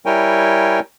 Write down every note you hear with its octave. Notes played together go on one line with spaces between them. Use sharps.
G3 E4 A#4 C#5 G5 G#5